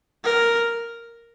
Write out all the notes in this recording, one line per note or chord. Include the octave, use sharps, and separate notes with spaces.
A#4